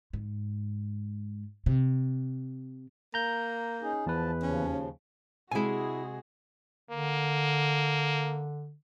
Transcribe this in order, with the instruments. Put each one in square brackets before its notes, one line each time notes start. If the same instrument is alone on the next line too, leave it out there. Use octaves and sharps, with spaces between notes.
[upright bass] G#2
C3
[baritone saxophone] A#3 [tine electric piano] A#5 G6
[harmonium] C#4 D#4 G#4
[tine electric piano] E2 B4 [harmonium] F3 A5
[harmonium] D#2 C#3 F3 [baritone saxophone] C#4
[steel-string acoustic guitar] C3 G#3 [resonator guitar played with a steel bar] E4 G#5 [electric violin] F#4 G#4
[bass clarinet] D3 [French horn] A#3